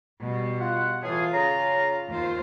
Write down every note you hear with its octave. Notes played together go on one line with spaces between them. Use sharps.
B2 G3
F4 F#5
A2 E3 F4 G#4
C#3 A#5
D#2 F4 C5